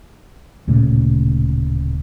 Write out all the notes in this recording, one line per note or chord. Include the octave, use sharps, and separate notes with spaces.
D1 A#2 C#3 A3